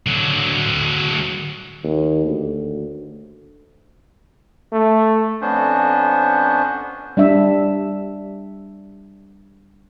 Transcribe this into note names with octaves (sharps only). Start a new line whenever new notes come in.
D3 F#3
D#2
D2
A3
F2 B3 C#4 D4 C5
G3 D4 E5